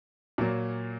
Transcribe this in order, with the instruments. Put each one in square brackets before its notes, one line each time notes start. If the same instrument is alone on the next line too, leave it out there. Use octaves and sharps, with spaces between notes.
[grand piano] A#2 F#3 A#3